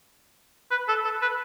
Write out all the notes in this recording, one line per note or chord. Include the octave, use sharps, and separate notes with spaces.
B4
A4
A4
B4